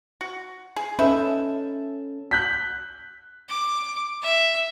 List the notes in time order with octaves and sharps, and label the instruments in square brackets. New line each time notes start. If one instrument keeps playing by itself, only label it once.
[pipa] F#4
G#4
[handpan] C#4 A4 [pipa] D#4 B4 E5
[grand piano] F#6 G6 B6
[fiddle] D6
E5